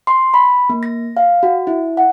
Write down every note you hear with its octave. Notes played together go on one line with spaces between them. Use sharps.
C6
B5
A#3
A#6
F5
F#4
E4
F#5